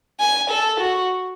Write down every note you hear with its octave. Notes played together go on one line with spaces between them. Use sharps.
G#5
A4
F#4